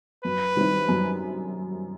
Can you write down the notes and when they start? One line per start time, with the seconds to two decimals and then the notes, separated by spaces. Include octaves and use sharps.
0.24 F#2 B4
0.56 D#3 G3 C4 E4
0.89 F#2